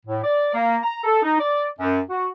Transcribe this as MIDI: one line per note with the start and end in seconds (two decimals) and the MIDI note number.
0.06 0.23 45
0.24 0.53 74
0.54 0.78 58
0.83 1.02 82
1.04 1.22 69
1.23 1.39 63
1.39 1.66 74
1.79 1.99 42
2.10 2.27 66